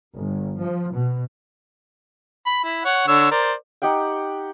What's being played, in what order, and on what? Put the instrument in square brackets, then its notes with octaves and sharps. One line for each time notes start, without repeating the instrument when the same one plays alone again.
[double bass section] G1
F3
B2
[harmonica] B5
E4
C#5 F#5
D3 C#5 E6
A#4 C5 D5
[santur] D#4 G4 F#5 G5